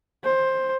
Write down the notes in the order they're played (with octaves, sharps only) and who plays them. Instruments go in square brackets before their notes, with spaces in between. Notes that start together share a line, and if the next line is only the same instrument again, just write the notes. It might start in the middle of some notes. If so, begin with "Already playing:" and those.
[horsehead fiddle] C5